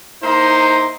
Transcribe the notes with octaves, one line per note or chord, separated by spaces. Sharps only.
A#3 D#4 E4 C5